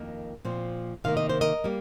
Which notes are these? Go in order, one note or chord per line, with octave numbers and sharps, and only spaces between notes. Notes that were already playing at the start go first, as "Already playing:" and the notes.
Already playing: F2 D#3 A#3
A#2 F3 C4
C3 D#3 A#3 F5
D#5
C5
A#4 D#5
G3 A#3